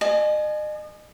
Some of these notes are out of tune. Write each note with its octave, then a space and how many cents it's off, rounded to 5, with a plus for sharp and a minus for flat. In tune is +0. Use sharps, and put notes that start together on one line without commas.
D#5 -40 G#5 +25